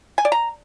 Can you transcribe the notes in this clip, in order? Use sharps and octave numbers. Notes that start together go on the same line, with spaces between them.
G#5
D5
A#5